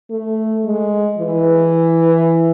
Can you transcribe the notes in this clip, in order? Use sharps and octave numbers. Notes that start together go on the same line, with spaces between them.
A3
G#3
E3